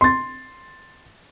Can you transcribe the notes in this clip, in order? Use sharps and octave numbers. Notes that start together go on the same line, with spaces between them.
C6 A6